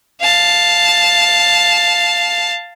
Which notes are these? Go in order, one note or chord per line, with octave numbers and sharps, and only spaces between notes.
F5 A5